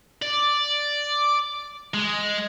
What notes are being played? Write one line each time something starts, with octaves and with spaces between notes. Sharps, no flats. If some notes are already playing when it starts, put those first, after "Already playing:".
D5
G#3